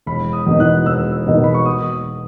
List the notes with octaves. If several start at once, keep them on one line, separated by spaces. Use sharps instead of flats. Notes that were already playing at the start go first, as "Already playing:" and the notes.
E1 B5
D#6
E2 B2 A#3 D#4
F#6
E1 E6
E2 B2 A#3 D#4
B5
C#6
D#6